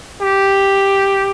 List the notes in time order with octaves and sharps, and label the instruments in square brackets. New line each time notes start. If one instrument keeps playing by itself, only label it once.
[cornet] G4